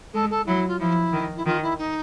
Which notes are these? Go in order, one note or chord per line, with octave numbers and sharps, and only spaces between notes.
G#3 A4
A4
F#3 E4
F4
F3 E4
D#3
E4
D#3 F4
E4
D#4